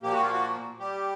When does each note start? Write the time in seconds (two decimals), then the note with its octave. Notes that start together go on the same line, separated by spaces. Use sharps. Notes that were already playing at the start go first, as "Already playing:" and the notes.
0.03 A#2 F3 A#3 G4
0.12 F#4
0.22 F4
0.32 F#4
0.80 G3 G4